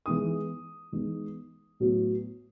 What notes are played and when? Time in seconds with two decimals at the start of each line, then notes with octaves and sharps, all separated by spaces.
0.06 E3 G#3 B3 D#4 D#6
0.92 E3 G#3 B3 D#4
1.80 A2 F#3 B3 E4